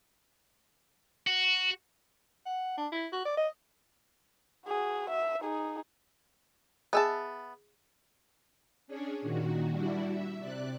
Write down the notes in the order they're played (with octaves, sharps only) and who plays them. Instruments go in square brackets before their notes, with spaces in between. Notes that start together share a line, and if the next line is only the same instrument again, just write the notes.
[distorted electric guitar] F#4
[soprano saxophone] F#5
D4
E4
F#4
D5
D#5
[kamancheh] F#4 G#4
E5
D#4 G#4
[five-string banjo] B3 E5 A5 [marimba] G#4 D#5 G#5
[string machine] C#4 D4 G#4 C#5
A#2 D#3 F#4
G3 D4 E4 F#4
E5
C3 D5 F#6